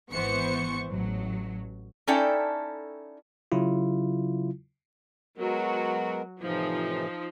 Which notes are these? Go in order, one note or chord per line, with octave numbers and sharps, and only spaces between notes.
G#1 E3 B3 C5 C#6 C#7
A1 F#3
C#4 D#4 E4 A4 D5 G5
C#3 F#3 E4 F4
F#3 G#3 B3 F#4 A#4
A2 C3 E3 F3 D#4